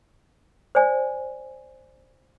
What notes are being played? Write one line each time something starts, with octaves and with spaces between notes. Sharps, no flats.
C5 D5 G#5